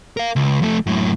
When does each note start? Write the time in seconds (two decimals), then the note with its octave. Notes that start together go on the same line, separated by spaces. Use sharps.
0.17 A#4 F5
0.36 C#2
0.62 F2 A3
0.86 F#2 A2